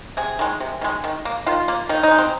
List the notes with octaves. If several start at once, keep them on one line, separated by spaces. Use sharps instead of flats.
C3 G#4
D#3 G#3
C3
D#3 G#3
D#3
A#3
D#3 F4
A#3
D#3 D#4
D#4
G#3
C4